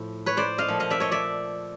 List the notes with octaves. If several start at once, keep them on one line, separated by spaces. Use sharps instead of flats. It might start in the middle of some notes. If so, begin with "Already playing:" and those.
Already playing: A2 F3
B4 C#5
C5 D5
D#5 F5
A#2 F3 A3
D#5 F5
D5 E5
C#5 D#5
D5 E5